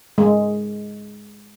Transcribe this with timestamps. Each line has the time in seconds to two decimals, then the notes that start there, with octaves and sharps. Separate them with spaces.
0.18 G#3